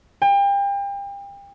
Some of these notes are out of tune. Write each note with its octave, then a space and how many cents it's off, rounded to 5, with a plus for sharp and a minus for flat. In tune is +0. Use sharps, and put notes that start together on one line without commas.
G5 +35